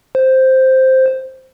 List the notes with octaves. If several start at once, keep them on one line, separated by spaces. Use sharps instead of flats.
C5